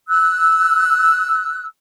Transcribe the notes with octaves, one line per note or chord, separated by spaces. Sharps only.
E6 F#6